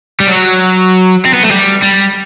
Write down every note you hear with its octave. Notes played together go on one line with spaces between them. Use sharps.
G3
F#3
C4
B3
A3
G3
G3